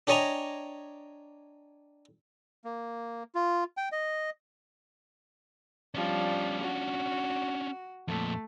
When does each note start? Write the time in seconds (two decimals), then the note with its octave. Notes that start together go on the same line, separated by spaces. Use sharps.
0.07 D4 G4 C#5 D#5 G#5 A#5
2.64 A#3
3.35 F4
3.77 G5
3.92 D#5
5.94 F3 G3 C#4 D4
6.62 F#4
8.08 F2 A#2 A3